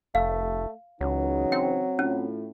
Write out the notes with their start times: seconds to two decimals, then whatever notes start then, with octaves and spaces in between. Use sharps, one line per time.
0.15 F1 A3 F5
1.01 C#2 C#3 E3 F#3 D#4
1.52 C4 G5
1.99 A2 C#4 F4